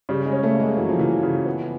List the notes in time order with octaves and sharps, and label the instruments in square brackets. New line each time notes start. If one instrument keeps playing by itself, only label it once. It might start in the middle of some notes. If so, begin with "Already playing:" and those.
[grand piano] C#3 [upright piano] G3
[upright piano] G#3
[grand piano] C#4
[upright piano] A3
[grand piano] A#3
[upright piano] G#3
[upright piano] E3 [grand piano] F#3
[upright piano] F3
[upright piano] E3 [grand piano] A#3
[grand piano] C#3
B3